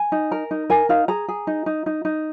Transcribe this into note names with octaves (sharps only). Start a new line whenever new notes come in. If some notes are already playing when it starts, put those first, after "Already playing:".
Already playing: G#5
D#4
A#4
D#4
A#4 G#5
D#4 F5
G#4 A#5
G#4
D#4
D#4
D#4
D#4